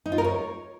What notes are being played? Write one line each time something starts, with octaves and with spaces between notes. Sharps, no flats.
D#4
F4
A#4
C#5